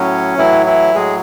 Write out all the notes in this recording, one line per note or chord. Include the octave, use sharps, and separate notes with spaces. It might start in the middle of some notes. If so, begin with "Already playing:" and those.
Already playing: A2 F#3 C#4
A2 E3 F#3 E4
E3 E4
A2 F#3 G#3 G#4